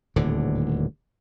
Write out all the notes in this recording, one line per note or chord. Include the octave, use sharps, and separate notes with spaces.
D#1 D2 A2 D3